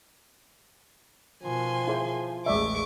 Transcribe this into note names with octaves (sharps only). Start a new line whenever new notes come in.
B2 D#3 F3 G#5 C6
E4 G#4 C5
A1 D#2 G#3 D5 E5 C#6 D6